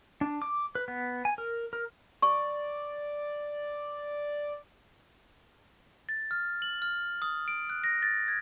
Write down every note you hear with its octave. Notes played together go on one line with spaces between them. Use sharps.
D4
D6
B4
B3
G#5
A#4
A#4
D5 C#6
A6
F6
F#7
F6
D#6
D7
F#6
A#6
A6
G#6